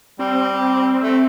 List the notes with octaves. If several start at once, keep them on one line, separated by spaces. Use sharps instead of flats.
G3 C4
A3